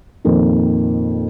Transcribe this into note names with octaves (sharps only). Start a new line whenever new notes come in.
F2 A#2 D#3